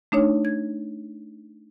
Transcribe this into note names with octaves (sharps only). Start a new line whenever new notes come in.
A3 D4 D#4 C#5
G#6